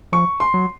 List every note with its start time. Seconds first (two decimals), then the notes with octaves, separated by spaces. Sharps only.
0.12 F3 C#6
0.40 C6
0.54 F#3